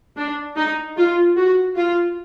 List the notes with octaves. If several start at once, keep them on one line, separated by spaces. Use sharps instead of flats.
D4
D#4
F4
F#4
F4